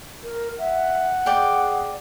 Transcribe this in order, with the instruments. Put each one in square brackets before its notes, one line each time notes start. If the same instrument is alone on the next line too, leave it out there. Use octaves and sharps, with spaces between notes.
[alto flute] A#4
[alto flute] E5 [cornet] F#5
[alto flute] G#4 [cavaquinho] D5 G5